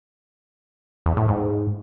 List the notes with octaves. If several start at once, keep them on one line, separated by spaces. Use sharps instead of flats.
E2
A2
G#2